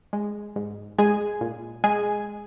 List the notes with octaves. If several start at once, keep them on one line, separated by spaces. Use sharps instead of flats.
G#3
G#2
G#3 G#4 G#5
A#2
G#3 G#4 G#5